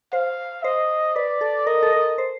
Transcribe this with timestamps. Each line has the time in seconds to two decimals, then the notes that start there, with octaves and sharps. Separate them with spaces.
0.13 C5 F5
0.63 C5 D#5
1.15 B4 D5
1.41 A4
1.67 A#4 D#5
1.83 A4
1.92 A#4
2.18 C5